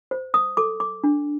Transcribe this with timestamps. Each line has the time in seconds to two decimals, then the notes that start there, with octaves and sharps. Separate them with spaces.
0.11 C5
0.34 D#6
0.57 A4 D6
0.80 D6
1.04 D4